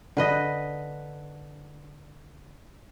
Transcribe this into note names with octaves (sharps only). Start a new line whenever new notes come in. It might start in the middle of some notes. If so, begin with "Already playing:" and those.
D3 B4 D#5